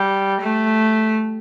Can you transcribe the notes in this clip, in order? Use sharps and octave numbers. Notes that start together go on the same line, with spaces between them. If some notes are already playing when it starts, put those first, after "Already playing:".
Already playing: G3
A3